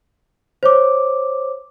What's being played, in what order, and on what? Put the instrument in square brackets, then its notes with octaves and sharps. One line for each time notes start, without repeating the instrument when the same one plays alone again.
[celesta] C5 C#5 D6